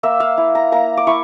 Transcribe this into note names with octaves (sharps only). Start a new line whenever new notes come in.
A#3 E5
F5
E4
A#5
A#3 A#5
D6
E4 C#6